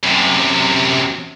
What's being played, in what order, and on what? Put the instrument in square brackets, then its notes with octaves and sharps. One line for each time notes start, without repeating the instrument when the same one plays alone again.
[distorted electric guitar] F#2 C3